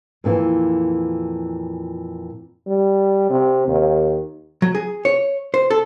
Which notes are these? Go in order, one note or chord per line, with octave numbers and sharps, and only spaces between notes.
F2 A#2 D#3 E3
G3
C3
D#2
F#3
G#4
C#5
C5
A4